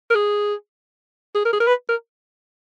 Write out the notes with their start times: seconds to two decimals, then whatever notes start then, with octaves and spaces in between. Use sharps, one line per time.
0.10 A#4
0.15 G#4
1.35 G#4
1.45 A#4
1.53 G#4
1.60 A#4
1.67 B4
1.89 A#4